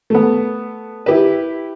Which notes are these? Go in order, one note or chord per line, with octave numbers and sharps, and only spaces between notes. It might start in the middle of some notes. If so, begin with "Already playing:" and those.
A3 B3
E4 G4 B4